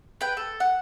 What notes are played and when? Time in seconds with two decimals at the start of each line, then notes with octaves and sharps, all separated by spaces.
0.21 B4 G5
0.37 A4
0.60 F#5